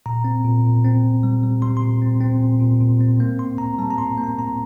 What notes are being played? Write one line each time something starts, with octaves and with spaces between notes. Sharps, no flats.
A#2 A#5
C4
A#2
A#2
C4
A#2
G3
G3
G3 C6
C6
A#2
C4
C4
A#2
A#2
A#2
C4
A#3
A2 C6
A2 A#5
G3 A5
A#5
A2 C6
A#3
A#5
A2 A#5